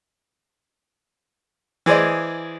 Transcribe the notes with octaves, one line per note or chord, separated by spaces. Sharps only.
E3 G#4 C5 D5 D#5